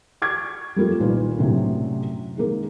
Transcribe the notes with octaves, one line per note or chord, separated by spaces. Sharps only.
C#6 D6 G#6
G3 A3 A#3 F4
C2 A#2 D#3 B4
F#2 A2 C3 F#3 D4
D#3 G#3 A#3